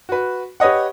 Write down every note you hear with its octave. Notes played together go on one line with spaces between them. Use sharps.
F#4 B4
G4 B4 C#5 D#5 F#5